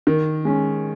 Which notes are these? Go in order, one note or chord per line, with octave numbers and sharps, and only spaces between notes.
D#3
G#3 C#4